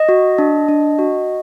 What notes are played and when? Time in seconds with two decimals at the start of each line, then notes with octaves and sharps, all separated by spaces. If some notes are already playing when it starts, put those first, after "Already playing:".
Already playing: D#5
0.09 F#4
0.38 D4
0.68 D4
0.99 F#4